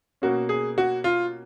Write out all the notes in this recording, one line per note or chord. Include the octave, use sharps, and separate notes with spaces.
B2 A#3 C#4 F#4
G#4
F#4
F4